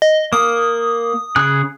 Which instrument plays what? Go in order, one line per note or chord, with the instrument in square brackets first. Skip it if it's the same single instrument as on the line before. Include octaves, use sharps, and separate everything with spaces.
[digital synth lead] D#5
[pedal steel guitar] A#3 [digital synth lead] D#6
[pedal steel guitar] C#3 G#4 F#6